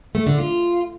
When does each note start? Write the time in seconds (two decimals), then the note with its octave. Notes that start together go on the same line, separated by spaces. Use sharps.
0.15 A3
0.27 D3
0.38 F4